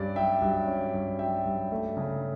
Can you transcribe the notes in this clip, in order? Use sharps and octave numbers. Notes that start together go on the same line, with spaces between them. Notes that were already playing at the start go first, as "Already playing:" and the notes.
Already playing: G2 C#4 D5
F#3 E5 G5
G2
C#4
G2
F#3 E5 G5
G2
A3
C#3